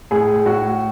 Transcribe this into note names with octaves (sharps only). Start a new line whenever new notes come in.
A2 G#4
A2 F#4